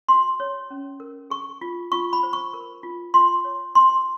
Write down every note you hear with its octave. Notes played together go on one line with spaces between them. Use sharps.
F#4 C6
C#5
C#4
A#4
G#4 C#6
F4
F4 C#6
B5
C5
C#6
A#4
F4
F4 C6
C#5
G4 C6